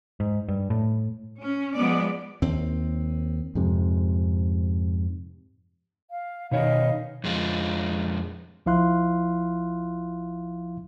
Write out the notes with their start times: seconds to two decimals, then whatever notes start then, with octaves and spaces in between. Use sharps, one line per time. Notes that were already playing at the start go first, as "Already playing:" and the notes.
0.20 G#2
0.48 G2
0.70 A2
1.41 C#4
1.74 F3 G#3 B3 D5
2.42 D#2 C4
3.55 F2 G#2 C3
6.10 F5
6.51 B2 D#3 C#5 D#5 F5
7.24 F2 G#3 F4
8.66 C2 F3 E4 F5 C6 F#6